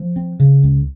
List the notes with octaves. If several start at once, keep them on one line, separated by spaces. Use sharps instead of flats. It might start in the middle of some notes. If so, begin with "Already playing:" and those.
Already playing: F3
C4
C#3
C#2